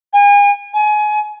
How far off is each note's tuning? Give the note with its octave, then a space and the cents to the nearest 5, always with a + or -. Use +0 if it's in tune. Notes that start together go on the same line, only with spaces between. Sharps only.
G#5 -35
G#5 +25